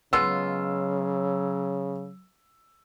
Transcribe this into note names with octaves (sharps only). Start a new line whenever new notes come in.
C#3 F#3 G#3 B3 F4 E6